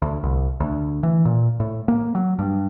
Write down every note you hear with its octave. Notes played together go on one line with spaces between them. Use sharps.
D2
C2
D2
E3
A#2
A2
A#3
F#3
G2